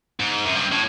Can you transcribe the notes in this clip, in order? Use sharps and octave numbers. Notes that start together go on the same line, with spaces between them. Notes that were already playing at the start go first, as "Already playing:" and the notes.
G#2
F#2
G2
A2